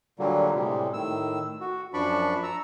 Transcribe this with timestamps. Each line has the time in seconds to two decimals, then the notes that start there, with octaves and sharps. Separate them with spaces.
0.19 A#2 D3 F#3 G3 A#3
0.55 A2 C3 G3 G#3
0.93 A2 D#3 E6
1.61 F#4
1.94 F#2 F3 D4 D5 B5 C#6
2.43 A#5 E6